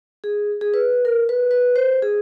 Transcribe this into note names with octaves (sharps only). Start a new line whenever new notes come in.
G#4
G#4
B4
A#4
B4
B4
C5
G#4